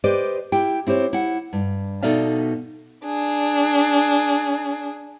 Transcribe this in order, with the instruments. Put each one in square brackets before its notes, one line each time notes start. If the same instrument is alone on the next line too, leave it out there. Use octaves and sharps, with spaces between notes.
[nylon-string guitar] G4 B4 C5 D5 D#5
E4 G4 G5
C4 E4 G4 C5 C#5
E4 F#5
G2
B2 D#4 A4 D5 E5 F5
[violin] D4 G#4